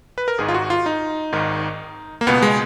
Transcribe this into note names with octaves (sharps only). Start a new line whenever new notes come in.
B4
A#4
G#1 G#2 D#3 G#4
F4
F#4
F4
D#4
G#1 G#2 D#3
A#3
C#2 B2 B3
G#3